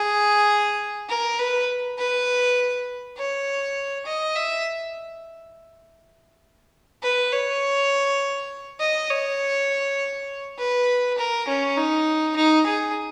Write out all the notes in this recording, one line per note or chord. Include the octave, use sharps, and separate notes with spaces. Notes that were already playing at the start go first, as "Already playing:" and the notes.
Already playing: G#4
A#4
B4
B4
C#5
D#5
E5
B4
C#5
D#5
C#5
B4
A#4
C#4
D#4
D#4
G#4